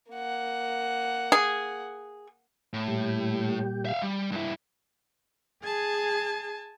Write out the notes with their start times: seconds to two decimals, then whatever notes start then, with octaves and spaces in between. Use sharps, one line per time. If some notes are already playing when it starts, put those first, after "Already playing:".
0.11 A#3 F#5
1.32 G#4
2.74 A2
2.88 A#2 G3 G4
3.85 E5 F5
4.02 G3
4.32 G2 E4
5.63 G#4 G#5 A5